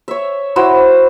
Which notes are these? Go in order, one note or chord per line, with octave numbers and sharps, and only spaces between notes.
C#5 E5
E4 F#4 C5 E6